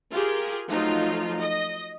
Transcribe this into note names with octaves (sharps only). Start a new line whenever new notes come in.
F4 G4 G#4 A#4
F3 F#3 A3 D#4 F4
D#5